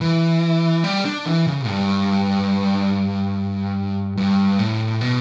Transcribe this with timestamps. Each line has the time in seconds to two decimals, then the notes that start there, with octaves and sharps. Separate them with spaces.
0.01 E3
0.84 G3
1.05 D4
1.26 E3
1.46 C#3
1.67 G2
4.17 G2
4.59 A2
5.01 B2